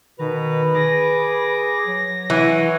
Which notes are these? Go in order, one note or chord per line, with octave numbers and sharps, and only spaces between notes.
B2 D#3 B4 A#5
G#4 D6 A#6
F#3
E3 C#5 F#5 G#5